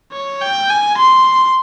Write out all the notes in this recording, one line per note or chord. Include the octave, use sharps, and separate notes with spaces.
C#5
G5
G#5
C6